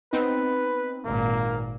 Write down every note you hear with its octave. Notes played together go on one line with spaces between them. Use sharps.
B3 C4 D#4 B4
G#1 A#2 A#3